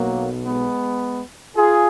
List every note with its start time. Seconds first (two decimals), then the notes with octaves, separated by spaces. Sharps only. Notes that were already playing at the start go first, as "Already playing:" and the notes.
Already playing: B1 B2 F#3 A#3
0.45 G#3 B3
1.55 F4 G#4